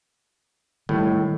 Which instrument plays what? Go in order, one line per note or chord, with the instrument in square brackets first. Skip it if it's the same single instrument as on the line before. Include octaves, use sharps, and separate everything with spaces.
[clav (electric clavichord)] A2 [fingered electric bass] D#3 G3